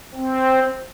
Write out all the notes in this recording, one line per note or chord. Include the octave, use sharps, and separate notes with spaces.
C4